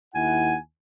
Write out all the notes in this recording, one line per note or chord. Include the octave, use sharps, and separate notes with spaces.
D#2 E4 F#5 G#5